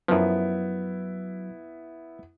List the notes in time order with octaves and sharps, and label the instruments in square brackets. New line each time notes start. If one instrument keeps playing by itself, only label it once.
[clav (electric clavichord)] F#2 F3 [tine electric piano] F#3 [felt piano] B3 E4